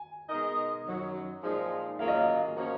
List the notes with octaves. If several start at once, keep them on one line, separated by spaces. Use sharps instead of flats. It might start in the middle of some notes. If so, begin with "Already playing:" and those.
Already playing: G#5
B2 G#3 D#4 A#4 D#5
F#2 D#3 F#3
A#2 F3 G#3 D#4 G#4
F#3 A#3 C#4 F4 G#4 F5
D#5
F5
F3 A#3 C#4 F#4